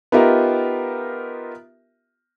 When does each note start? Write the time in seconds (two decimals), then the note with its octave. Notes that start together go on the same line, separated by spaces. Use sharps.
0.12 B3 D#4 F4 G4 A#4 E5